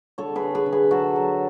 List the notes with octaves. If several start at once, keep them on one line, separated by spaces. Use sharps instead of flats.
D3 A4 C#5
G#4 B4
D3
G#4 B4
D3
G#4 B4
F#3 F#4 A4
F#3